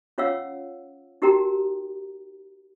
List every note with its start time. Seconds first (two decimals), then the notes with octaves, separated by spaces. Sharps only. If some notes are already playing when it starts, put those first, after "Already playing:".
0.18 C#4 F4 C#5 F5 F#5 E6
1.22 D#4 F#4 G4 A#4 G5 A#5